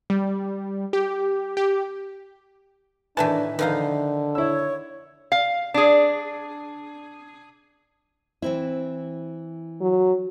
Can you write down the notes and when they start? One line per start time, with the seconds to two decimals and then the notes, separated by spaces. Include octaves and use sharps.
0.10 G3
0.93 G4
1.57 G4
3.17 A2 D#3 E3 D4 B4 E5 G#5 A5
3.59 D3 D#3 F3 D#4 B4 F5
4.35 E4 C#5 E6
5.32 F5
5.74 D4 G#4
8.42 E3 C4 E4
9.81 F#3